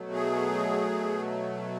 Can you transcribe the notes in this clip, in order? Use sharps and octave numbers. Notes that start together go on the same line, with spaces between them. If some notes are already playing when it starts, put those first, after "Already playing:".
Already playing: B2 F#3 A3
G#4